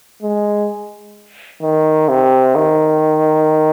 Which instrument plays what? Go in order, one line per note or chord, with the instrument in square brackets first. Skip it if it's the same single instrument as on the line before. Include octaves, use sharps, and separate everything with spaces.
[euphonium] G#3
D#3
C3
D#3